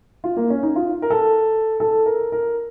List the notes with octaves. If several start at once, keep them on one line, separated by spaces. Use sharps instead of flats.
F4
A#3
C#4
D#4
F4
A#4
A4
A4
A#4
A#4